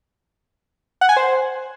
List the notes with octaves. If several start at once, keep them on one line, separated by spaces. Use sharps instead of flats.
F#5
G#5
C5